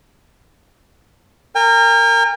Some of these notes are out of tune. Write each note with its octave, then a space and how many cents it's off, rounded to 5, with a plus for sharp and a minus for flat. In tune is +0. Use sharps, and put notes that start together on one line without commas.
A#4 -20 G5 +45